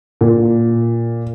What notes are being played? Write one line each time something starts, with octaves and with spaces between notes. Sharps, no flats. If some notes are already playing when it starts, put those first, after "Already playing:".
A#2